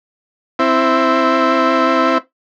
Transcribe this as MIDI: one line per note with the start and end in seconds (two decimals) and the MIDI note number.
0.59 2.18 60
0.59 2.18 64